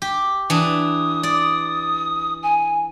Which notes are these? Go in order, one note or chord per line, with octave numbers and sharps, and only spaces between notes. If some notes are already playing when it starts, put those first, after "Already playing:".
G4
E3 D4 D#6
D5
G#5